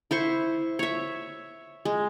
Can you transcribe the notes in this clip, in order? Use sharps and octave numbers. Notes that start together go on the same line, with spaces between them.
E4 C5 C#6
C#5 E5
G#3